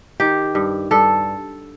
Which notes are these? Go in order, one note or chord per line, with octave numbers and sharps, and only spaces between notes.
D#3 G4
G2
G2 A4